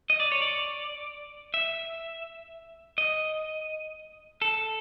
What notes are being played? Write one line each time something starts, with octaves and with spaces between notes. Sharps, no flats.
D#5
D5
C#5
D5
E5
D#5
A4